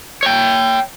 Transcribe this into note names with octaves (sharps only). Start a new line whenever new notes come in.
C#5 G5